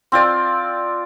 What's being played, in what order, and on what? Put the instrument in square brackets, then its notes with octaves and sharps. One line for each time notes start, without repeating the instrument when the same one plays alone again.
[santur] C4 F4 D5